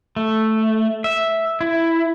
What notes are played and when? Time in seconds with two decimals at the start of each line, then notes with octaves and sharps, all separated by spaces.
0.16 A3
1.04 E5
1.61 E4